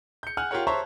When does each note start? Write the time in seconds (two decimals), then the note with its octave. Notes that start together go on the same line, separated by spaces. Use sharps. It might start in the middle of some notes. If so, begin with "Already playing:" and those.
0.23 G6 C#7
0.37 F#5 G#5 F6 F#6
0.51 F4 G4 A#4 C#5 F#5
0.67 C5 C#5 E5 A5 A#5 C#6